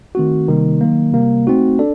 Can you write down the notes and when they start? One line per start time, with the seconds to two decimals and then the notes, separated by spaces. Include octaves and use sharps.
0.15 D#3 A3 C4 F#4
0.48 C3 D#3 G3 A#3 D#4
0.81 D#3 F#3 A#3
1.13 C3 G3 A#3
1.47 A3 C4 D#4 F#4
1.79 D4 A4 D5